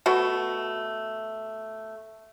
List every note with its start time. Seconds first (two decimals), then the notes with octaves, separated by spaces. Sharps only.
0.06 B2 A3 F#4